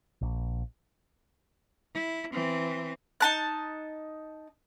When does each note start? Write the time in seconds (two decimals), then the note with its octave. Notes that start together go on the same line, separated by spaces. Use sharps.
0.21 A#1
1.94 E4
2.32 E3 C4
3.20 D#4 A5 F#6